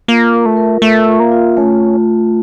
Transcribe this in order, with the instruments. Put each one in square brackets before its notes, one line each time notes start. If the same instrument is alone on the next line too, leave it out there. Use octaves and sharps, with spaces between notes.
[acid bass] A#3 [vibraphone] F4
[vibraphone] A#4
[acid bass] A3
[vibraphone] A#4
[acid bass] A3 [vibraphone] E5
[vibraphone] F4
[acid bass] A#3
[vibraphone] F4
[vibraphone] A3 [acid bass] C#4